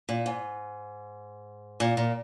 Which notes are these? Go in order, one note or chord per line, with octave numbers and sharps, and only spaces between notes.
A#2
G#2
A#2
A#2